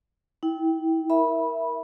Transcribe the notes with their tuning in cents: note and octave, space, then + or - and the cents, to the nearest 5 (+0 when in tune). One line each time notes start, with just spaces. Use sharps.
E4 -35 G5 +0
A#4 +10 E5 +0 B5 -20